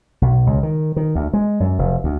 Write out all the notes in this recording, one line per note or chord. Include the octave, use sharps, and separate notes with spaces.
B1
C#2
D#3
D#3
D2
G#3
F#2
F1
D2